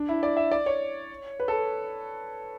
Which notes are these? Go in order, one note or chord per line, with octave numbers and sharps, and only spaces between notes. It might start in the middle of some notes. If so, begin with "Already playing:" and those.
Already playing: D4
E4
D5
E5
D5
C#5
B4
A4